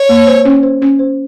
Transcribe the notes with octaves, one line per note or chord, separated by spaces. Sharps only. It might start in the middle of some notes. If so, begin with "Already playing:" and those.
Already playing: C#5
A#3
C5
C#4
C5
C#4
C5